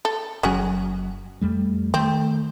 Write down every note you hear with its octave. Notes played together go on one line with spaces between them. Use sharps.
A4
F#1 F#3 C#4 F#4 G#4
F2 G3 A3
D#3 A3 C4